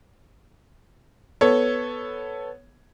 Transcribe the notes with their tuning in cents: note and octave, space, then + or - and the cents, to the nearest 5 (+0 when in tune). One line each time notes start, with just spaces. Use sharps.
B3 +0 A4 +0 C#5 +0